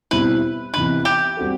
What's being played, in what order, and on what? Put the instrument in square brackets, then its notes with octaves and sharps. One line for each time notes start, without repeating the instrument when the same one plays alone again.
[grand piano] B2 G3 C4 E4 [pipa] B4
[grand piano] C3 E3 B3 D#4 [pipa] B4
[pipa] G4
[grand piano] G3 C4 F#4 A4